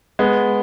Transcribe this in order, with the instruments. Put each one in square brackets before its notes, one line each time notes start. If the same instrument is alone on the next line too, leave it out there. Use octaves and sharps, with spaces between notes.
[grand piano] G#3 B3